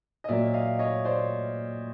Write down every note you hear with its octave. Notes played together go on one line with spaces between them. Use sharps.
D#5
A#2 F#3 A#3 D5 E5
D#5 F5
C#5 D#5
C5 D5